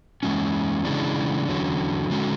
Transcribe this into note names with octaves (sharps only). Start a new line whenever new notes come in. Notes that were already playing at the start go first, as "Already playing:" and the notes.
E2 D3 G#3 C#4
C#3 E3 G#3 D4
E2 D3 F#3 C#4
D3 G#3 C#4 F#4 A4